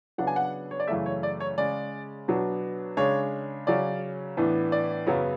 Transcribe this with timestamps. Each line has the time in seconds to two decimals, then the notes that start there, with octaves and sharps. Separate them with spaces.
0.18 C#3 F#3 B3 D4 F#5
0.27 G#5
0.36 F#5
0.71 C#5
0.80 D5
0.88 F#2 C#3 E3 A3 E5
1.06 C#5
1.23 D5
1.40 C#5
1.58 C#3 G#3 C#4 D5
2.28 B2 F#3 B3 D4
2.97 C#3 G#3 D4 C#5
3.67 C#3 F#3 C#4 D5
4.37 A2 E3 B3 D4
4.72 D5
5.06 F#2 C#3 F#3 B3